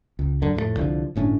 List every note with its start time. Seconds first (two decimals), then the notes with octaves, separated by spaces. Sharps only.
0.19 C#2
0.42 F#2 D3
0.55 F2 A2 F#3 A3
0.77 C2 D3 F3
1.16 G1 A2 C#4 D4